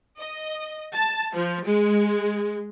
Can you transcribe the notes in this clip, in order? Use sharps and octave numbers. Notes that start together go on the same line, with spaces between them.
D#5
A5
F3
G#3